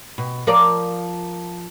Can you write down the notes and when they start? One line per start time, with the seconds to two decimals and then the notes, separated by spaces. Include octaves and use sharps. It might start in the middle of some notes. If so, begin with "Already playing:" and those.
0.18 B2
0.47 F3 A#4 D5